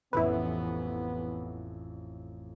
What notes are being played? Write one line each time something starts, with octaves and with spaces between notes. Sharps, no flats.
A1 F2 A2 C3 E3 B3 E4 B4